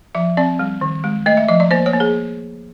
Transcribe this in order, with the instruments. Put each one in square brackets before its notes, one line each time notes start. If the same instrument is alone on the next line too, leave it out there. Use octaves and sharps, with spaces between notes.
[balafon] F3 E5
C4 D5
G3
D#3
G#3
A3 D#5
E5
F3 D#5
D5
A#3 C5
C#5
A#3
G#4